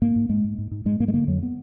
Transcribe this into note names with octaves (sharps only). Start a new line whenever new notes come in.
G#2 A#3
G#2
G#2 G#3
G#2
G#2
G#2
G#2 G#3
G#2 A#3
G#3
D3 A#3
F2 F#3
B3